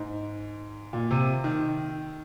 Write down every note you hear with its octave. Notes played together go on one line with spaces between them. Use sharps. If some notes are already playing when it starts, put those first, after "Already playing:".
Already playing: G#2
A#2
C3
D#3